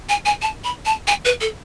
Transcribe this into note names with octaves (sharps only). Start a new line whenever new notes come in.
G#5
G#5
A5
B5
A5
G#5
B4
A4